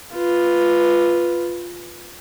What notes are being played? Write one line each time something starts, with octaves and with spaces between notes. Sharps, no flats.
F4 B4